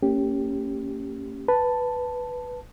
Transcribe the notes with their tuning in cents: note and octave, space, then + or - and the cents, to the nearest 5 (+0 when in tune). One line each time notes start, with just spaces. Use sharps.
A#3 -35 C#4 +0 G4 +0
B4 +0 A5 +0